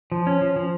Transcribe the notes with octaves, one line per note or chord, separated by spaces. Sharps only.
F3
C#4
F3
F3